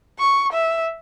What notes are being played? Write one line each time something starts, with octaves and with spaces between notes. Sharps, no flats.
C#6
E5